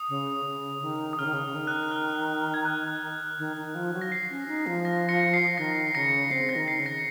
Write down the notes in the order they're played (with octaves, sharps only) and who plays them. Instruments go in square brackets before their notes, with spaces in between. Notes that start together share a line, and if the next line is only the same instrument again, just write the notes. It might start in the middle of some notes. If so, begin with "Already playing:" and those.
Already playing: [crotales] D#6
[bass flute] C#3
C#3
D#3
[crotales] D#6
[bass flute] C#3 [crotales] F6
[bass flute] D#3
C#3
C#3
D#3
[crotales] F#6
F6
G#6
F#6
[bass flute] D#3
D#3
F3
F#3
[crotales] A#6
C7
[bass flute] C#4
D#4
F3
[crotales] A#6
A#6 C#7
C7
[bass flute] D#3 [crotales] A#6
[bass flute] C#3 [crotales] A#6 C#7
[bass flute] C4 [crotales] C7
[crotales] A#6
[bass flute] D#3
[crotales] C7
[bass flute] C#3
[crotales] A#6 C#7